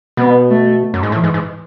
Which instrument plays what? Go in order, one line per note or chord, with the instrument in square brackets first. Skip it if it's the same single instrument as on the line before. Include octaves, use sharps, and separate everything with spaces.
[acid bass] B2 [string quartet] B3
[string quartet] A3
[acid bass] F#2
G#2
[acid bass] A2 [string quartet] E3
[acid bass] G#2
G#2